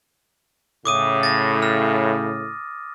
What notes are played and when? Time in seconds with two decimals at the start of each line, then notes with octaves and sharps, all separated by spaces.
0.85 A2 C#3 D6 D#6 D#7
1.23 A6 A#6
1.62 F6